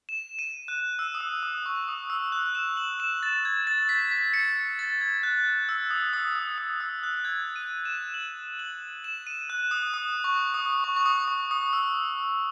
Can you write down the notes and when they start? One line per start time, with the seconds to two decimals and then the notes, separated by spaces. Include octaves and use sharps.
0.09 E7
0.39 D#7
0.68 F#6
0.99 E6
1.15 D#6
1.21 E6
1.43 D#6
1.66 C#6
1.88 D#6
2.10 E6
2.32 F#6
2.55 E7
2.77 F#7
3.00 E7
3.23 A6
3.45 G#6
3.67 A6
3.82 A6
3.89 B6
4.12 B6
4.34 C#7
4.79 A6
5.01 G#6
5.23 F#6
5.69 E6
5.91 D#6
6.13 D#6
6.36 D#6
6.58 D#6
6.80 E6
7.03 F#6
7.25 G#6
7.56 D#7
7.85 E7
8.14 F#7
8.59 F#7
9.04 E7
9.27 D#7
9.50 F#6
9.71 D#6
9.94 D#6
10.24 C#6
10.54 D#6
10.84 C#6
10.97 C#6
11.06 D#6
11.28 C#6
11.51 D#6
11.73 E6